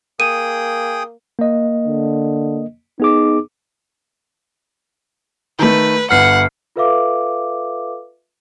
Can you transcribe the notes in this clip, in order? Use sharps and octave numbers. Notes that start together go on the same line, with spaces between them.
A#3 G#4 G5 D#6 D#7
A#3 D#5
D3
B3 D#4 G#4 D6
D#3 A3 B4
G1 B4 F#5 F6 C7
F4 A4 B4 E5 F5 D6